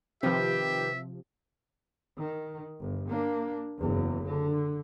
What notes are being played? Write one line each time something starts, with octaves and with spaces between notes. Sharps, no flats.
C3 D#3 F3 G4 B4 E5
D#3
G1
A#3 D4
F#1 E2
D3